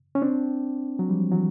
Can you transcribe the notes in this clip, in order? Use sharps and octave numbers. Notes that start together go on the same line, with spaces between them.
C#4
C4 D4
F#3
F3 G3
E3 F#3